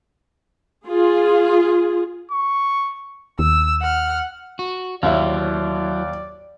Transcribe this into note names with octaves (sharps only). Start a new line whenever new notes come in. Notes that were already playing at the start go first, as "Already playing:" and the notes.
F4 G#4
C#6
D#2 E6
F#5 F6
F#4
D#2 F#3 E4 D5 E5